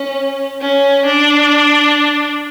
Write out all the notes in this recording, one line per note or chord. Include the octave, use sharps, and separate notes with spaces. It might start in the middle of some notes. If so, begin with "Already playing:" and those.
Already playing: C#4
C#4
D4